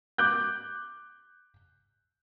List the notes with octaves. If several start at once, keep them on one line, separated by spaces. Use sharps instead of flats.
D6 F#6 G6